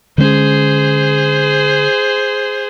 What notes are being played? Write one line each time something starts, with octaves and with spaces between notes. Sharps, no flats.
D3 G#3 C#4 G#4 C5